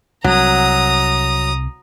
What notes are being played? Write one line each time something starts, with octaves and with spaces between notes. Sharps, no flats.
C2 F#3 A#5 D#6